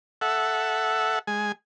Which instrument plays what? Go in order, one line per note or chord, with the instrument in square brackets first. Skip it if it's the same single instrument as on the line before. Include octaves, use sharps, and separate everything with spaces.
[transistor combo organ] A4 E5 F#5
G#3 G#5